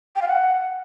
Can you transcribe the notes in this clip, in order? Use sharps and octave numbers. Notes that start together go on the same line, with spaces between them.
G5
F5
F#5